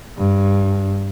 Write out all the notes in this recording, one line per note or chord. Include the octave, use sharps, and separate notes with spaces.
G2